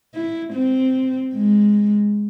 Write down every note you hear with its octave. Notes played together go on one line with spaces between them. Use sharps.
E4
C4
G#3